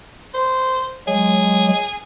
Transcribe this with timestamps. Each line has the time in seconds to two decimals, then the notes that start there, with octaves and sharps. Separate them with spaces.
0.34 C5
1.08 F#3 G#3 G#4